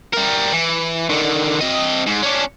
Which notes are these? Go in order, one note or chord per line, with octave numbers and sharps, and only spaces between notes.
G3 A#4
E3
D3 D#3
C4 D#5
G#2
C#4 D4